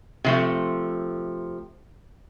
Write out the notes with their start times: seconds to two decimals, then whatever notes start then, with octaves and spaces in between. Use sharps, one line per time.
0.24 C3 F3 A3